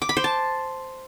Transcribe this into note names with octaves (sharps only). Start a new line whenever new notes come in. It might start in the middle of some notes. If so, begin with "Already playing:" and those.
D6
B5
C5
A5